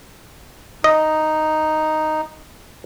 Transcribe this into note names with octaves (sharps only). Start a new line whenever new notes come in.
D#4 D#5